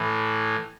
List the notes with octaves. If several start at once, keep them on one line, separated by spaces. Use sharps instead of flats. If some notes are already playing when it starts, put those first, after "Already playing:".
Already playing: A2 E3